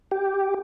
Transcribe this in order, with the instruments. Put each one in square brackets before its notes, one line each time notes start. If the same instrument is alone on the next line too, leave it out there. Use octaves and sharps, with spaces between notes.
[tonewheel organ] G4